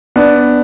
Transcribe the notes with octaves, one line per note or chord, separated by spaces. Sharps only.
B3 D4